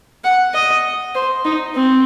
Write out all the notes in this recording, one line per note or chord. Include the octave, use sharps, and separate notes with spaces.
F#5
D#5
C5
D#4
C4